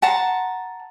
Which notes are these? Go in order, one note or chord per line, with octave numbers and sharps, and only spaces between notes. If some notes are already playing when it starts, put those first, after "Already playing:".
F#5 A5 A#5 C6